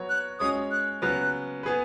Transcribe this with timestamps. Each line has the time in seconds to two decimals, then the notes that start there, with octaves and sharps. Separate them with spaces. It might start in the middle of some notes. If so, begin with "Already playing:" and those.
Already playing: F#3 B3 F#4 C#5
0.10 F#6
0.40 G#3 C#4 F#4 C#5 D#6
0.71 F#6
1.02 C#3 F#3 B3 F#6
1.63 B3 G#4 B4